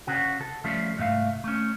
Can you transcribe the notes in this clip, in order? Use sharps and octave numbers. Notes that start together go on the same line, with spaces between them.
C#3 F#4
A4
C#3 F3 G3 A3
C2 G#2 C3 A3 F5
A3 C#4